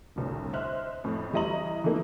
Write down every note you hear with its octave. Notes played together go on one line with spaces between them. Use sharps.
G1 C2 A2
C5 D#5 E5 F6 F#6
F2 A2
E3 G3 E4 D#5 A#5 F#7
E3 F3 A3 A#3 D#4 E4